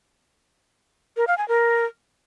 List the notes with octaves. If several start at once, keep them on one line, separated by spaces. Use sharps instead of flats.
A#4
F5
G#5
A#4